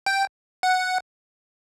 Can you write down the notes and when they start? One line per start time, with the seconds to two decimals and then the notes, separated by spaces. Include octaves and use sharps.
0.06 G5
0.63 F#5